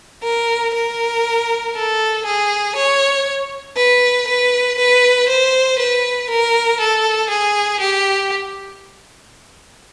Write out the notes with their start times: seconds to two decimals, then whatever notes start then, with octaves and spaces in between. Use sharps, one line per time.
0.23 A#4
0.74 A#4
1.75 A4
2.25 G#4
2.76 C#5
3.76 B4
4.27 B4
4.78 B4
5.29 C5
5.79 B4
6.30 A#4
6.80 A4
7.30 G#4
7.80 G4